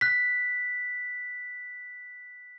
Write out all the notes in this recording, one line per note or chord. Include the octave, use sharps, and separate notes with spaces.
F#6 B6